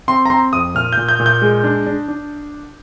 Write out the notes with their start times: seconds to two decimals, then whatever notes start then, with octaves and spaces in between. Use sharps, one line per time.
0.08 C4 C6
0.25 A#5
0.30 C4 C6
0.53 F2 D#6
0.75 A#2 F6
0.93 A#2 G6
1.09 G6
1.20 A#2
1.26 G6
1.42 G#3
1.64 D4
1.87 D4
2.08 D4